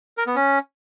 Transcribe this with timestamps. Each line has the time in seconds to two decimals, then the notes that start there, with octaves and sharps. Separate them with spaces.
0.18 A#4
0.27 B3
0.36 C#4